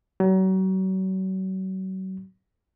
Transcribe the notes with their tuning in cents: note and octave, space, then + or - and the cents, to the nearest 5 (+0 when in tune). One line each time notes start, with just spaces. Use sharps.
F#3 +35